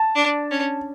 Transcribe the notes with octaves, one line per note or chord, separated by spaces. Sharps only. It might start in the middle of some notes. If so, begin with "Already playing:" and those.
Already playing: A5
D4
C#4